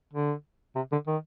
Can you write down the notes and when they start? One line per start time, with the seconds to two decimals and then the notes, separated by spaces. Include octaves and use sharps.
0.13 D3
0.75 C3
0.91 D3
1.07 D#3